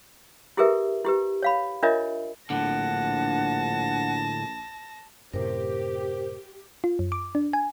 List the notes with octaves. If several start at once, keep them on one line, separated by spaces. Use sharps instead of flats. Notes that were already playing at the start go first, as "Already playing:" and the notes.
E4 G4 G#4 A#4 B4 E5
E4 G4 B4
C#5 F5 B5
D4 F4 A#4 C#5 D#5 E5
A#1 A2 D3 F#5 A5 A#6
F#2 A2 C3 G4 A#4 C5
F4
F#2
D6
D4
G#5